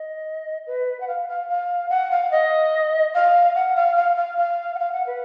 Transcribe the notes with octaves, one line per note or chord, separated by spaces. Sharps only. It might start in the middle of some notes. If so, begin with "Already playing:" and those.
Already playing: D#5
B4
F#5
F5
F5
F5
F#5
F5
D#5
F5
F#5
F5
F5
F5
F5
F#5
F5
F#5
B4